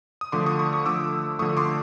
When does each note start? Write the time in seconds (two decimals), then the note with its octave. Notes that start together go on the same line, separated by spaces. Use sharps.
0.21 D#6
0.32 D3 F3 A3 C6 D6
0.46 C#6 D#6
0.59 C#6 D#6
0.73 C#6 D#6
0.86 D3 F3 A3 D6 E6
1.39 D3 F3 A3 C#6 D#6
1.57 C6 D6